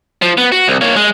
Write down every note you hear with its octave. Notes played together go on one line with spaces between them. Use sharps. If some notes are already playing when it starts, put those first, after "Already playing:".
F3
B3
F#4
C2
A#3 C#5
G#3